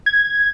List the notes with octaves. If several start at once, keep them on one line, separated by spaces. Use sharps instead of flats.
G#6